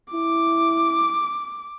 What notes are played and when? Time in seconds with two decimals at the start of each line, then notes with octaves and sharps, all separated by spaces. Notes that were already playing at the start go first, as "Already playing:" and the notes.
0.14 E4 D6